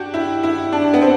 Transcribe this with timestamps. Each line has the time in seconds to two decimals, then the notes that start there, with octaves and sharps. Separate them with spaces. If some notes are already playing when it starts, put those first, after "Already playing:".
Already playing: D4 F#4 G4
0.14 E4
0.43 E4
0.72 D4
0.93 B3
1.02 C4